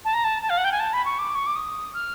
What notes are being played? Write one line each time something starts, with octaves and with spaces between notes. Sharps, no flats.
A5
A#5
A5
A5
F5
F#5
G5
G#5
A5
B5
C#6
D6
C#6
D6
D#6
F6